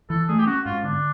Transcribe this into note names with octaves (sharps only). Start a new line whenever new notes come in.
E3 A4
A3 G#4
G4
C#4 F#4
G#2 F4
D3 D4